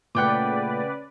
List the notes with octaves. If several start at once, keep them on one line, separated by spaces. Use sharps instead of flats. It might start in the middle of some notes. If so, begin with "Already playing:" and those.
A#2 C#3 A3 B4 D5 F#5 G5 D6